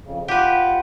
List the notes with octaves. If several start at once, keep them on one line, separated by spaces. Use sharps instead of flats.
F2 C#3
F4 G4 B4 F#5